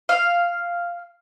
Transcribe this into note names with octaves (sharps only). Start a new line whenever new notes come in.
F5